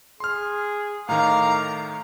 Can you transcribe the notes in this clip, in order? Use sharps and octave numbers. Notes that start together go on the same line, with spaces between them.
G#4 C6 F6
A2 D#3 F5 A#5 D6